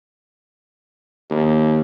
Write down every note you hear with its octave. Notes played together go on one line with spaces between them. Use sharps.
D#2